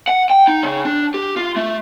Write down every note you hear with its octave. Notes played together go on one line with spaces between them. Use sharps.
F#5
G5
D#4
C#3
D4
G4
F4
A3